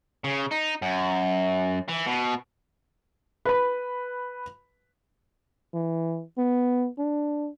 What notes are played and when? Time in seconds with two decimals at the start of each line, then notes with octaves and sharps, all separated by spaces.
0.24 C#3
0.51 D#4
0.82 F#2
1.89 E3
2.07 B2
3.45 B4 B5
5.74 E3
6.38 B3
6.98 D4